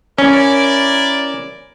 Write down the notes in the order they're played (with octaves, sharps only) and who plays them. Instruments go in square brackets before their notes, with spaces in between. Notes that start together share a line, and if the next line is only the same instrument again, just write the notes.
[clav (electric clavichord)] C#4 [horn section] E4 A#4 D5